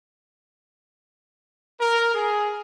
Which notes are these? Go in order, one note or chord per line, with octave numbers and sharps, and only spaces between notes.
A#4
G#4